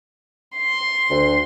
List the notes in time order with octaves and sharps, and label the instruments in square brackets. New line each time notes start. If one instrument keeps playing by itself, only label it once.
[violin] C6
[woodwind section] D2